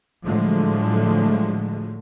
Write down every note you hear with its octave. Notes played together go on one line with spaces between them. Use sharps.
A2 D3 F3 F#3 G#3 A3